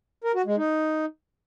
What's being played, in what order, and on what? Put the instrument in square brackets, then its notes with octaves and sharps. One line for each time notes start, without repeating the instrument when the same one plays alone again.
[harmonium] A#4
F#4
G#3
D#4